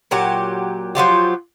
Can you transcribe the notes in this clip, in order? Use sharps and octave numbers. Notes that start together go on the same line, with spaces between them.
A#2 F#3 G4
F3 F#3 F4 G4